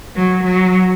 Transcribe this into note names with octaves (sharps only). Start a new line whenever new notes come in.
F#3
F#3